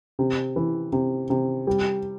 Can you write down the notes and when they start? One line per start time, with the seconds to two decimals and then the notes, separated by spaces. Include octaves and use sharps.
0.19 C3
0.56 E3
0.92 C3
1.30 C3
1.67 G3